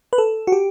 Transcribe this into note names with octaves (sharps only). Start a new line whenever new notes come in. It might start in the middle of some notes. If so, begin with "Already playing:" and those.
B4
A4
F#4
G4